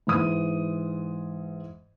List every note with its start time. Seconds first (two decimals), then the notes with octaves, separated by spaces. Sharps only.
0.07 G#2 E3 D#6